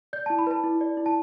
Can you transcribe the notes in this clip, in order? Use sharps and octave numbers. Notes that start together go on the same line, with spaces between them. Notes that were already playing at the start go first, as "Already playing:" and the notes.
D5 G6
A5
E4
B5
B4 A5
E4
D5
E4
A5